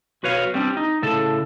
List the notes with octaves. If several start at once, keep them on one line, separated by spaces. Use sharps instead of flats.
B1 F#4 B4 C#5 F5
G3 C4 D4
D#4
A2 C#3 A4 A5